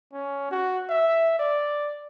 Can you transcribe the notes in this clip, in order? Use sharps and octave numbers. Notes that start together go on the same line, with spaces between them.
C#4
F#4
E5
D5